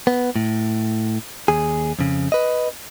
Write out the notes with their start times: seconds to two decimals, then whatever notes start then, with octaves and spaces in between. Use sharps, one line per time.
0.07 B3
0.36 A2
1.48 D#2 G#4
1.99 F2 C#3
2.32 B4 D#5